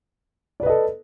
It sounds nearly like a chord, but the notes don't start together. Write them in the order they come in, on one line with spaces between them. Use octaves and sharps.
D5 B4 D#5 A4